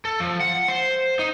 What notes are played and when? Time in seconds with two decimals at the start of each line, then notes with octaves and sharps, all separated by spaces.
0.05 A4
0.20 F3
0.40 F#5
0.68 C5
1.19 D#4